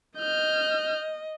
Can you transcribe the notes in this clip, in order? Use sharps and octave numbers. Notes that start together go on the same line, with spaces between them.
D#5 F6 G6